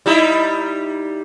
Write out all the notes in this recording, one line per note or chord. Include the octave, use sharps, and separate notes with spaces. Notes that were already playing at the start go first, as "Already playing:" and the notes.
G3 D#4 E4